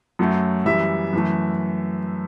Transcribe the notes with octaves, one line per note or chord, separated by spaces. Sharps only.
F#2 F#3 A3
F#2 E3 G3 E5
F#2 E3 A3